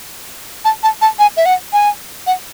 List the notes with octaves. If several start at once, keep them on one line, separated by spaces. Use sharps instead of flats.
A5
A5
A5
G#5
E5
F#5
G#5
F#5